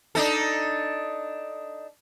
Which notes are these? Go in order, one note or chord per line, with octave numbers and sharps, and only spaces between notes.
D4 D#4 A4